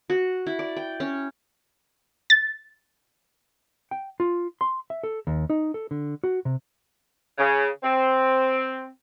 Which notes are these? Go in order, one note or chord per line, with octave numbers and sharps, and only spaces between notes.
F#4
E4
D5
G5
C#4
A6
G5
F4
C6
E5
A4
D#2
D#4
A4
D3
F#4
C3
C#3
C4